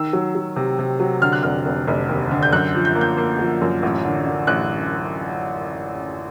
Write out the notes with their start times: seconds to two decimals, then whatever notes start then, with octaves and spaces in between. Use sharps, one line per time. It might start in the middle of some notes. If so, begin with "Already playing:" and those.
Already playing: D#3 E6
0.13 F#3
0.35 F#3
0.56 C3
0.79 C3
1.00 F#3
1.22 D3 F6
1.33 F#6
1.43 F1 F6
1.66 F1
1.87 F1
2.09 D#2
2.31 D3
2.43 G6
2.53 F#2 F#6
2.74 F3
2.85 G6
2.95 A#3
3.01 G6
3.18 A#3
3.39 F3
3.62 F#2
3.83 A1
4.05 D3
4.26 D3
4.47 A1 F#6